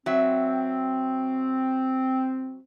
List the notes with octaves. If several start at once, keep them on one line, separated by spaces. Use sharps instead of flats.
F#3 C4 E5